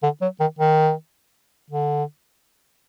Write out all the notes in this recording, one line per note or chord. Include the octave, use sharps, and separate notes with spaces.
D3
F#3
D#3
D#3
D3